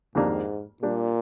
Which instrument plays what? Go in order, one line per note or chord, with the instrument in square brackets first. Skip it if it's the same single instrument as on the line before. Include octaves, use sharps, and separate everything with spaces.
[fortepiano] F2 D#3 A#3 D4 G4 [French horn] G#2
[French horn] A#2 [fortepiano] G3 D4 G4